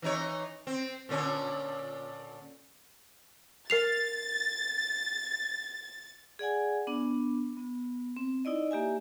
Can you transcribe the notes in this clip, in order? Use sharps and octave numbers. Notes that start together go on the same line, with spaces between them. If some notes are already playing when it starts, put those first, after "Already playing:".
E3 D#4 C#5
C4
A#2 D3 C#4
A#4 A6 C7 F7
G#4 D5 F#5 G#5
B3 D4
B3
C4
D#4 E4 D5 D#5
A#3 G4 E5 G#5